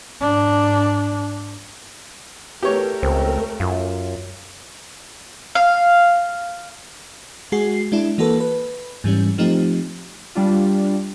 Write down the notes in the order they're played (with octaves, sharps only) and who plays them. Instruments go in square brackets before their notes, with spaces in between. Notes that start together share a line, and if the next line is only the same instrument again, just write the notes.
[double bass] G#2 D4
[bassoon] E2 [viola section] A3 A#4 [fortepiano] G4 C#5
[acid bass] C#2 [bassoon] C4
[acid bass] F#2 [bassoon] F4
[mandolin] F5
[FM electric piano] G#3 F#4 G#4 C7
G#3 D4 E4
E3 A#3 F#4 A4 B4
B4
G#2 E3 G3 C#4
F3 A3 C4 D#4 G4
[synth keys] G3 D4 F4